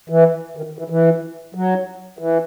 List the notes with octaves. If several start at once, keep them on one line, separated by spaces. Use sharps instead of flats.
E3
D#3
E3
E3
F#3
E3